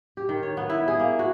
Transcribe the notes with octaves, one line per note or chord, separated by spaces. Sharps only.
G4
D#3
C#5
B3
E4
G#4
A#3
F#4